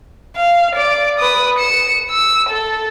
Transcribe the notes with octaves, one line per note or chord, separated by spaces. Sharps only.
F5
D5 D6
B4 D#6
C#7 E7
E6
A4